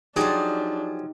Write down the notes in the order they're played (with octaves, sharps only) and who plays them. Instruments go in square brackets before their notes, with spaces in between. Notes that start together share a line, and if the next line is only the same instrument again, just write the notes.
[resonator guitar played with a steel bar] F3 F#3 [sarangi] D4 [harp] D#4 G4 G5 [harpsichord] G#4